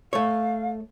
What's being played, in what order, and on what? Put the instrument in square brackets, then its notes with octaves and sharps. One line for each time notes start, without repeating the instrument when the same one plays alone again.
[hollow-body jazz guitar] A3 C#5 [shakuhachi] F5